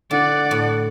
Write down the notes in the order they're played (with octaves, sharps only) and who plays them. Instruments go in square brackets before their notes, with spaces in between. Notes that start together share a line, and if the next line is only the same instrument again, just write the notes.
[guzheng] D3 [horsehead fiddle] D5 F#5
[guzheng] A2